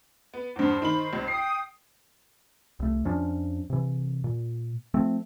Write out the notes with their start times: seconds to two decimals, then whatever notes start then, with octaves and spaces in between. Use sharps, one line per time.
0.34 B3
0.56 E2 G2 C5
0.82 D#3 B5 F#7
1.13 C#2
1.28 G5 D#6 C7
2.80 C2 A3
3.05 F2 F3 C#4 D4
3.70 C3 E3
4.24 A#2
4.94 F3 A3 C4